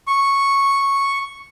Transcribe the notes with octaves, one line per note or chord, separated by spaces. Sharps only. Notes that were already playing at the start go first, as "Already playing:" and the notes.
C#6